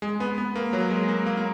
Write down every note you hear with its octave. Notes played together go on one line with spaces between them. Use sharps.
G#3
B3
B3
A#3
F#3
G#3
A#3
A#3
A#3